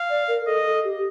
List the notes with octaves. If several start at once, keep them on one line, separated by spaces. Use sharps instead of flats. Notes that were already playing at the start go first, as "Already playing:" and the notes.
Already playing: F5
D5
A#4
A4 D#5
A4
G4